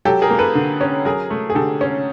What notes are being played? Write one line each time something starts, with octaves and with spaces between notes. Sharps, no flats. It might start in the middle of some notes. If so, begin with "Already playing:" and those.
F#3 G4 A4
G#4 A#4
A#3
A4 B4
D3
C#4
F#3 G#4 A#4
A3
G#4
D3 G4 A4
C#4